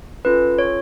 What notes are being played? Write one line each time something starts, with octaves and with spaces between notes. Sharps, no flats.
C#4 F4 A4 B4
C#5